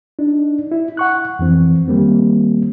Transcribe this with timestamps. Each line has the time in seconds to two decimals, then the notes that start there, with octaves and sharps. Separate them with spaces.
0.19 D4 D#4
0.72 E4
0.97 F#5 C#6 F#6
1.39 F2 E3 C4
1.88 D#3 G3 A#3 C4